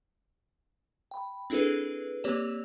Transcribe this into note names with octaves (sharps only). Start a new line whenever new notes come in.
G5 B5
C4 D4 E4 G#4 A4 B4
A#3 C4 G4 C#5 D5 E7